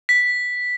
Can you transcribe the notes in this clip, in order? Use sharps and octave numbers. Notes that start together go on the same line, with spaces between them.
B6